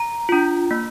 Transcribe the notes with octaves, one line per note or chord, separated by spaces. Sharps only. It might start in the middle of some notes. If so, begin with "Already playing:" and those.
Already playing: A#5
D4 F4
A#3